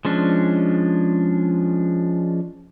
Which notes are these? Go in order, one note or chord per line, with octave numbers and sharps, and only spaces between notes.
F3 G#3 C#4 D4